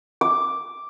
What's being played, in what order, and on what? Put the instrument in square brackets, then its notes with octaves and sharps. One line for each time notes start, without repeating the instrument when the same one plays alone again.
[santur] D6